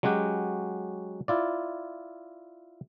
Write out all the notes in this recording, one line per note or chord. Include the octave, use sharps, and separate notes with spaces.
F#3 G#3 C#4 F#4 G4
E4 F4 D5